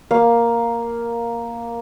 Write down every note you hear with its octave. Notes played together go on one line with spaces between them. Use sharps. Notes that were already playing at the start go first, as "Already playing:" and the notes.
A#3 F5